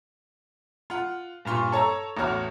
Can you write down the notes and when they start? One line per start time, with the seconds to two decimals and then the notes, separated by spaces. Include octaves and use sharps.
0.90 F4 F#5
1.45 G2 A#2 F4 C6 C#6
1.72 A4 C#5 A5 A#5 E6
2.17 A1 E2 A3 F#4 C#5 F6